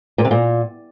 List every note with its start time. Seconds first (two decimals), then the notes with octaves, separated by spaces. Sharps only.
0.18 A#2
0.25 C3
0.31 A#2